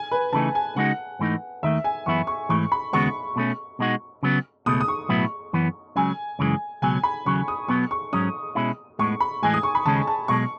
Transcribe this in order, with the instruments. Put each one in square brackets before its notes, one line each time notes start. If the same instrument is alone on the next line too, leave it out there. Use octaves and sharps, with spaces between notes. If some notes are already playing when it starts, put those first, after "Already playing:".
Already playing: [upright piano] G#5
B4
[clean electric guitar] C#3 E3 A3 D#4 [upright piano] A5
[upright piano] G#5
[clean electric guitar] C#3 G#3 D#4 F#4 [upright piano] F#5
[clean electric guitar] G#2 E3 A3 D#4
[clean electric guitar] D#2 D#3 A3 [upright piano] E5
[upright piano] G#5
[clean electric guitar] F#2 E3 B3 E4 [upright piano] C#6
[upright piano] C#6
[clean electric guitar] G#2 E3 A3 [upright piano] C#6
[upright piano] B5
[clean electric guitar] D#2 C#3 G#3 B3 F#4 [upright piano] C#6
[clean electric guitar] B2 A3 C#4
B2 G#3 D#4 F#4
C#3 F#3 B3
[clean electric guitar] C#2 B2 A3 [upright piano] D#6
[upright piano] D#6
C#6
[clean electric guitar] B1 A2 F#3 B3 E4
F#2 E3 B3
[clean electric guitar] C#2 C#3 F#3 [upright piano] G#5
[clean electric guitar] F#2 C#3 E3 G#3
[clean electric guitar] C#2 B2 F#3 [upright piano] G#5
[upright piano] B5
[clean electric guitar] D#2 C#3 F#3 [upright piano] C#6
[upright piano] D#6
[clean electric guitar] B1 B2 F#3 B3 [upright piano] C#6
[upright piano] C#6
[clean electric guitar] G#2 F#3 C#4 [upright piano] D#6
[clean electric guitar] B2 G#3 C#4 E4
[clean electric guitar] A2 G#3 B3 [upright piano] C#6
[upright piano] B5
[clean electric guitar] A2 E3 G#3 [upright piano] G#5
[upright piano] D#6
C#6
B5
[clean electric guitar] D#2 C#3 G#3 C#4 [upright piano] A5
[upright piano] A5
[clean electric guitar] B1 B2 G#3 [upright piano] C#6